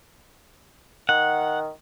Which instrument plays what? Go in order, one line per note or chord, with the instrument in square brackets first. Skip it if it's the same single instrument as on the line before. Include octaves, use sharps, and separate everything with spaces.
[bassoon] D#3 [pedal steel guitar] F#5